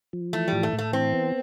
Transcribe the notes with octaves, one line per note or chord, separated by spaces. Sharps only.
F3
E3 A3
A2 G3
A3
A2
A3
E3 C4
B3